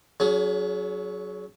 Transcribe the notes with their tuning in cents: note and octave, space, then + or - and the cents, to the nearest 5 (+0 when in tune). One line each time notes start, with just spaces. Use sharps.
F#3 +0 C#4 +45 G#4 +25